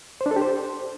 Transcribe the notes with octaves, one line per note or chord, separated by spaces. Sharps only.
C5
D4
A4
G4
C5